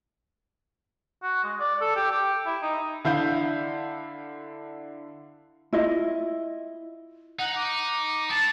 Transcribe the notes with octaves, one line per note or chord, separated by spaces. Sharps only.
F#4
G#3
D5
A4
G4
G4
E4
D#4
D3 E4 F5 G6
E4 F4 D#5
D#4 F#5
D6
E4 A5 A6